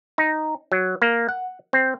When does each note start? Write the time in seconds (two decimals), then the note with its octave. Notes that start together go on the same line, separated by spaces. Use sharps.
0.18 D#4
0.72 F#3
1.02 A#3
1.29 F#5
1.73 C4